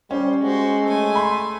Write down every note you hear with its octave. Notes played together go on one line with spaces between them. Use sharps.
G3 C#4 C5
G#3 F#4 C5
A3 G#5
B5 C6